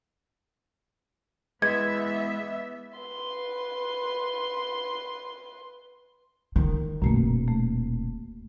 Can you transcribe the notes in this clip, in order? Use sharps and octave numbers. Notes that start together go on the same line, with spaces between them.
E3 G#3 B3 E5 G#6
B4 C6
D#3
D#1 F#2 B2 A3 A#3
A3